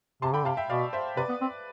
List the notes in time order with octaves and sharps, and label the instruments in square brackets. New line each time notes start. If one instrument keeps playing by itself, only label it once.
[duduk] C3 [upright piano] A5 C6
[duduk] D3 [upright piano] G5 B5
[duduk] C3 [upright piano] F5 A5
[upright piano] E5 G5
[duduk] B2 [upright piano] D5 F5
[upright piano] C5 E5
[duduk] C3 [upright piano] B4 D5
[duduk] B3
C4